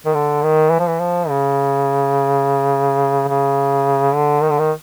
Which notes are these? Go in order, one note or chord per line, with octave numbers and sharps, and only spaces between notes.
D#3
D3
D#3
E3
F3
E3
F3
C#3
C#3
D3
D#3
D3
D#3